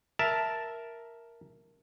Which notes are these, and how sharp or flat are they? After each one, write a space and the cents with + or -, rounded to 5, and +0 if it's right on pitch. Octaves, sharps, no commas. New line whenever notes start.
A#4 +0 E5 +0 A5 +0